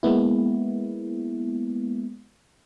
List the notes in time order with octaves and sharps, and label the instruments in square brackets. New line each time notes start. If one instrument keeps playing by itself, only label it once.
[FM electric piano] G#3 A#3 B3 E4